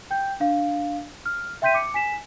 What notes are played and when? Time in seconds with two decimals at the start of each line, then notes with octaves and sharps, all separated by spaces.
0.11 G5 G6
0.40 D4 F5
1.26 F6
1.62 E5 G5 C6 G6 B6 D#7
1.74 D6 C#7
1.94 G#5 B6 E7